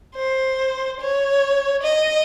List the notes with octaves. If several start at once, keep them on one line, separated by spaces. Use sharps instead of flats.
C5
C#5
D#5